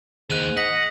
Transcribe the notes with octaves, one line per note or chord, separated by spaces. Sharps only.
D#2 G#2 F#6 D#7 F7
D#5 F#5 B6